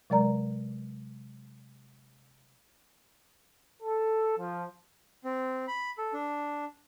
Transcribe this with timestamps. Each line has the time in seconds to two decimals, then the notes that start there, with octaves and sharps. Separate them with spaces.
0.10 C3 F#3 G#3 A#4 D5 A#5
3.82 A4
4.38 F3
5.23 C4
5.68 B5
5.98 A4
6.13 D4